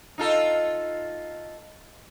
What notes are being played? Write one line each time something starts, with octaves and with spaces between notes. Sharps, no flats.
D#4 F4 A4